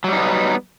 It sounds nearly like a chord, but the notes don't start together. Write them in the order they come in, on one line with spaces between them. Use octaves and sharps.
F#3 G3 D#4 B3